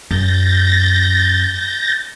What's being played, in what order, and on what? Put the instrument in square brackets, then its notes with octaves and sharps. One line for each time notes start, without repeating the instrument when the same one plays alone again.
[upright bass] F#2 [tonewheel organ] G6 A6 A#6